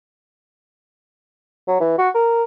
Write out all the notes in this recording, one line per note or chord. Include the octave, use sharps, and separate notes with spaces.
F#3
E3
F#4
A#4